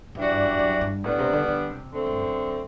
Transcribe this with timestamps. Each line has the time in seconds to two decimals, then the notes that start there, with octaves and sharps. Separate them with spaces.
0.15 F#2 E3 G3 D4 F#4
0.31 G2
0.45 F#2
0.59 F#2
0.81 G2
1.04 A2 G3 B3 D4
1.19 C3
1.33 D3
1.48 D3
1.69 C3
1.91 D3 A3 C4
2.06 G2
2.21 F#2